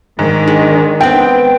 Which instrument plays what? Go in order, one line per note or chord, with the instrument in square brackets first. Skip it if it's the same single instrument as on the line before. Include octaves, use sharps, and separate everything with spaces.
[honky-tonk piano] G#2 [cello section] D#3 D4
[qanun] G#3
[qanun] B3 C4 [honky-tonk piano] G5